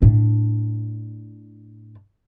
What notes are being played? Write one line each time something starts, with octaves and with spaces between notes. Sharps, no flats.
A2 D4